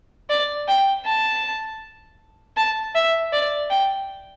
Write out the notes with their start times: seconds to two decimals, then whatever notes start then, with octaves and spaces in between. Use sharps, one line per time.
0.30 D5
0.68 G5
1.06 A5
2.57 A5
2.95 E5
3.33 D5
3.70 G5